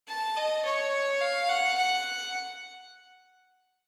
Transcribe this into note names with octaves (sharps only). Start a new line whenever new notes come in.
A5
D#5
C#5
F5
F#5
F#5